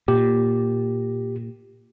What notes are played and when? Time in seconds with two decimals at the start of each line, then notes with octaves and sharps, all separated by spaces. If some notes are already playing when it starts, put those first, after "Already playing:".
0.08 A#2 G4